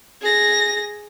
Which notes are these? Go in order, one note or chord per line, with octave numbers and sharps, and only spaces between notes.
G#4 A#6